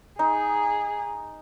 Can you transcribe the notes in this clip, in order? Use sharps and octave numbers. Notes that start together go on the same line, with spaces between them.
D#4 G#4